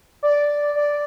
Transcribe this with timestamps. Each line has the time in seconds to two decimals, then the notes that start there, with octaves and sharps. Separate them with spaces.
0.23 D5
0.75 D5